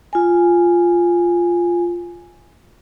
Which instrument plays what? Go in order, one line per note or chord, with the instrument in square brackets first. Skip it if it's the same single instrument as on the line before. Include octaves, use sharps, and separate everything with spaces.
[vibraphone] F4 G#5